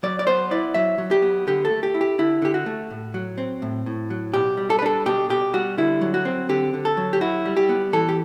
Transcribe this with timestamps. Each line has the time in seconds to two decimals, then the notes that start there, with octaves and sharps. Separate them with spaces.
0.03 F#3 D5
0.19 D5
0.27 B3 C5
0.51 E4 D5
0.74 F#3 E5
0.98 F#3
1.11 G4
1.22 B3
1.47 D3 G4
1.65 A4
1.70 A3
1.83 G4
1.94 E4
2.01 G4
2.19 D3 E4
2.42 D3 G4
2.54 F#4
2.66 A3
2.91 A2
3.14 F#3
3.38 C4
3.62 A2
3.86 A2
4.10 F#3
4.34 B2 G4
4.57 G3
4.70 A4
4.79 B4
4.82 D4 A4
5.06 B2 G4
5.30 B2 G4
5.53 G3 F#4
5.78 D3 E4
6.01 F#3
6.14 F#4
6.25 C4
6.49 D3 G4
6.74 D3
6.85 A4
6.97 F#3
7.13 G4
7.21 E4 F#4
7.46 G3
7.57 G4
7.69 B3
7.93 E3 A4
8.09 G4